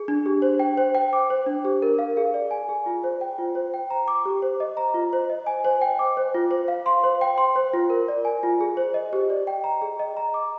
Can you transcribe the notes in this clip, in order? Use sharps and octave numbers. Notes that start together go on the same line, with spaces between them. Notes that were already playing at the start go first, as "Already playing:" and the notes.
Already playing: G#4
D4
G4
C5
G5
C5
G5
D6
C5
D4
G4
A#4
F5
G#4
D5
G#5
G#4
F4
C5
G5
F4
C5
G5
A#5
D6
G4
C5
D#5
A#5
F4
C5
D#5
G#5
C5
G5
D6
C5
F4
C5
F5
C6
C5
G5
C6
C5
F4
A#4
D5
G#5
F4
G#4
C5
D#5
G4
D5
G5
A#5
G#4
D#5
A#5
D6